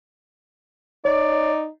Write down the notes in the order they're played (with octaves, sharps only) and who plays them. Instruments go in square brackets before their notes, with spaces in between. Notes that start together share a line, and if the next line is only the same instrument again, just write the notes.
[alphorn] D#4 [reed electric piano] C#5 [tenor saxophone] D5